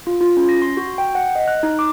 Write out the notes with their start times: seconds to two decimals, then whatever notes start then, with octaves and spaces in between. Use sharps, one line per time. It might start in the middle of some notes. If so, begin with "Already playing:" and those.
0.07 F4
0.21 F4
0.37 C#4
0.49 A#6
0.62 C6
0.77 F#4
0.98 G5
1.15 F#5
1.35 D#5
1.48 F#6
1.63 D#4
1.79 D6